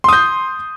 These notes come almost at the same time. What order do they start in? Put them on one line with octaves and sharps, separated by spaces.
C6 D#6 G6